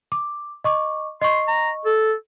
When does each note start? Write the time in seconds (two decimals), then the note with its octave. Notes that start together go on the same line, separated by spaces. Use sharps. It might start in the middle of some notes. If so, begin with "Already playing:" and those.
0.12 D6
0.64 D#5 C#6 D6
1.22 D#5 C6 C#6
1.48 A#5
1.86 A4